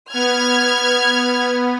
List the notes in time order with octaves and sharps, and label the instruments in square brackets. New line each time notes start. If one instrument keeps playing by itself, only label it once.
[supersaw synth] B3 [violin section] F6 G#6